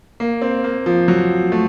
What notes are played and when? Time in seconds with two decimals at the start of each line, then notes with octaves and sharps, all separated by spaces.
0.20 A#3
0.42 C4
0.64 A#3
0.86 F3
1.08 F#3
1.52 A3